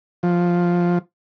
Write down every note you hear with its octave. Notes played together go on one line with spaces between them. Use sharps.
F3